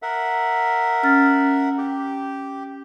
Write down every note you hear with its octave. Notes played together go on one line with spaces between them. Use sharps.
A#4 E5 F#5
C#4 F6 A6
G4